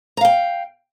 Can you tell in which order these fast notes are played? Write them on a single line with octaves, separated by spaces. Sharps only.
A#5 F5 G5